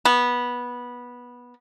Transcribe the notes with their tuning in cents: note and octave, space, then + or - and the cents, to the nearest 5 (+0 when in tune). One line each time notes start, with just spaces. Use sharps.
B3 -15